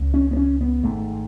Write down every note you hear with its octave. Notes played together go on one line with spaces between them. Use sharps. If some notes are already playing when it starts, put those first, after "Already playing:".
Already playing: C#2 C#3
C#4
B3
C#4
B3
G#1 G#2 A3